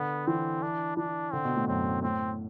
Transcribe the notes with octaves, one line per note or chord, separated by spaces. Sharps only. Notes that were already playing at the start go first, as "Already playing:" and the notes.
Already playing: D3 B3
E3 C4
D4
E3 D4
D3 C4
B2
A2
F#2 C4
A2 C4